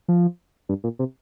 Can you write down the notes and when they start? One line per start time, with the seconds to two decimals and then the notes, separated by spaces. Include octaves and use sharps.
0.08 F3
0.69 G2
0.84 A#2
0.99 C3